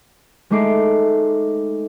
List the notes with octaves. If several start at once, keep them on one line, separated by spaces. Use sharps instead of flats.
G#3 A3 D#4 D6 C7 D7